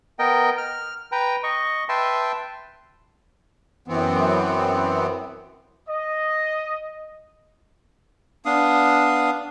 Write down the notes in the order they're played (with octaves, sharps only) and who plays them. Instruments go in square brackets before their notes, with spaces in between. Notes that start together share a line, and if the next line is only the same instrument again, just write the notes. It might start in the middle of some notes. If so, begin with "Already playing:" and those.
[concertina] B3 A#4 D#5 G5
F6
B4 G5 A#5
D#5 C#6
B4 E5 G5 A5 C6
[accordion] F#2 E3 B3 C4
[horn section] D#5
[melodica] B3 D4 F5 D#6